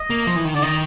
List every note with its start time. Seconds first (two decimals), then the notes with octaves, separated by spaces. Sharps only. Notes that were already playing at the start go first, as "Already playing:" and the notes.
Already playing: D#5
0.10 A#3
0.27 F3
0.36 E3
0.45 D#3
0.54 D3 D5
0.62 D#3 D#5